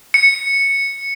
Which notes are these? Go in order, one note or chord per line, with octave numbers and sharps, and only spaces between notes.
C#7